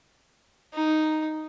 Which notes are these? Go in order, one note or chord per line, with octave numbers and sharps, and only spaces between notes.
D#4